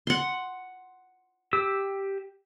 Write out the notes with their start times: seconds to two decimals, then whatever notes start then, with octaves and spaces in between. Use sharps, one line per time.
0.07 F#5 C6
1.53 G4 E6